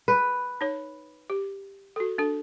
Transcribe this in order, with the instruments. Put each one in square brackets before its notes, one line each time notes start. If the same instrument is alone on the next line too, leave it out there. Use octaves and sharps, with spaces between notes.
[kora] B4
[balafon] D#4 C#5
G4
F#4 A4
D4 A4